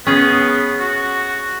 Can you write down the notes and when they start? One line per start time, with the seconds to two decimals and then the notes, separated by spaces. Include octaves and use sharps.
0.06 B3 C#4 G#4
0.80 F#4